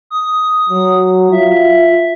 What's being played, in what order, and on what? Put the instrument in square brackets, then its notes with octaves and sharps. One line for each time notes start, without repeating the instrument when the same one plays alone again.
[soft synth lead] D#6
[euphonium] F#3
[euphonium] F4 [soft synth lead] E5